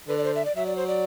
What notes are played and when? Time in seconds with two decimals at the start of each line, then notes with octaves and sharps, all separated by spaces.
0.08 D3 B4
0.18 D5
0.24 C5
0.36 E5
0.45 D5
0.56 F#3 E5
0.66 D5
0.76 C5
0.88 D5